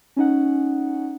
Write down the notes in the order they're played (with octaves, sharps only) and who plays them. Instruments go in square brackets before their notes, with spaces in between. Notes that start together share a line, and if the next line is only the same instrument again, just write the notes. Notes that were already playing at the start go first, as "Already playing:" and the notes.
[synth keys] C#4 D#4 F#5